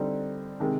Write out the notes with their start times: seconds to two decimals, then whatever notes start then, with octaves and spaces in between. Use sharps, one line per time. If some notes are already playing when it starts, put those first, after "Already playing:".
Already playing: D3 G3 C4 D#4
0.60 C3 D#3 G#3